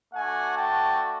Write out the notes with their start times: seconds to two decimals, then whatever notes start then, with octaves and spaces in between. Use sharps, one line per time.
0.13 A3 D4 F#4 F#5 G#5
0.57 G5 A5